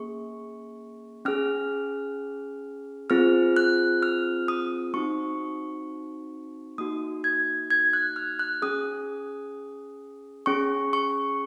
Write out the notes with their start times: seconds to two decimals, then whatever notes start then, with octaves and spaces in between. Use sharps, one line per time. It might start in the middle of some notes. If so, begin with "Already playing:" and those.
Already playing: A#3 C#4 G#4 C#6
1.25 C#4 G#4 F6
3.10 C4 F4 G#4 F6
3.57 F#6
4.03 F6
4.48 D#6
4.94 C4 D#4 F#4 C#6
6.78 A#3 D#4 F#4 D#6
7.24 G#6
7.70 G#6
7.93 F#6
8.16 F6
8.39 F#6
8.62 C#4 G#4 D#6
10.46 C#4 G#4 C#6
10.93 C#6